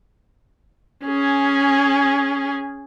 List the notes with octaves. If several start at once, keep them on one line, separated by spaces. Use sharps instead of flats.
C#4 G#4